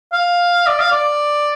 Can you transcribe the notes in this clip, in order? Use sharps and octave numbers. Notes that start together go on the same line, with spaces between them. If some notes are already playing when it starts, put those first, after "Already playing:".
F5
D5
F5
D5